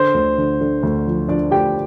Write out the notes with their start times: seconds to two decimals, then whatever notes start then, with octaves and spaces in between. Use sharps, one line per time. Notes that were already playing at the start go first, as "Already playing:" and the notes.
Already playing: D3 C5
0.14 D2
0.38 D3
0.61 D3
0.83 D2
1.06 F3
1.28 F3 D4 D5
1.51 D2 G4 G5